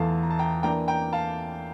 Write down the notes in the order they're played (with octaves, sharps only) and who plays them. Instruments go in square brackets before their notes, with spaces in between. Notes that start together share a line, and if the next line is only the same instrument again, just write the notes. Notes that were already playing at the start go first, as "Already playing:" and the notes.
Already playing: [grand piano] E2 E3 A3 E4 A4 [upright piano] F5 A5 A#5
[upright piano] A#5
A5
G5 A#5
[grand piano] E3 A#3 D4 [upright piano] G5 A#5
[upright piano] G5 A#5
F5 A5